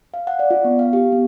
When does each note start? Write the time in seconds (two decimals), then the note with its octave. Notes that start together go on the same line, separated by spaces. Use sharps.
0.14 F5
0.27 F#5
0.39 D5
0.51 F4
0.65 B3
0.79 F5
0.93 G4
1.12 B3